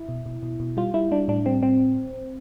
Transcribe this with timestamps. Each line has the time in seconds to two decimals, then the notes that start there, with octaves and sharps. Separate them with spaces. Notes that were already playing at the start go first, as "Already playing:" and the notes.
Already playing: E4
0.09 B2
0.26 B2
0.43 B2
0.60 B2
0.77 G3 F4
0.94 G3 E4
1.11 G3 D4
1.28 A2 D4
1.45 G3 C4
1.63 A2 C4